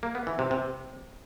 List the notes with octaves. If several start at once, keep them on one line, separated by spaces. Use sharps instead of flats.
A#3
B3
E3
C3
C3